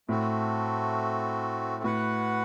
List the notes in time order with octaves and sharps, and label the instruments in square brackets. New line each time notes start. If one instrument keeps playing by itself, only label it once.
[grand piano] A2 [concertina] A3 C4 F#4 A4
[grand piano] A2 [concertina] F#4 B4 F#5